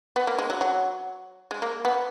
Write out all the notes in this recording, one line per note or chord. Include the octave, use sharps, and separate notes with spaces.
B3
A#3
G#3
F#3
F#3
G#3
A#3
B3